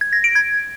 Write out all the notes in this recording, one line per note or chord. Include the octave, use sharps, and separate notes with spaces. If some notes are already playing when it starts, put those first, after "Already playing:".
G#6
A#6
D7
G#6